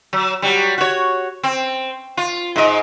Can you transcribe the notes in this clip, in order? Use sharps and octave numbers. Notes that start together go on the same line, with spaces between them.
F#3
F#3 G3
F#4 C#5
C4
F4
G#2 D#5